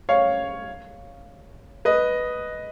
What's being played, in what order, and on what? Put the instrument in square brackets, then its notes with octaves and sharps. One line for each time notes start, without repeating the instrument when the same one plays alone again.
[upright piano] C#5 F5
B4 D#5